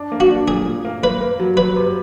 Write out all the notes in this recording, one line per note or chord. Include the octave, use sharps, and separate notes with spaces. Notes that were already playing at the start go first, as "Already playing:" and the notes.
Already playing: D4
A#3
F#4
D4
A#2 G#4
A#2
A#3
A#3 B4
A#3
F#3
F#3 B4
C3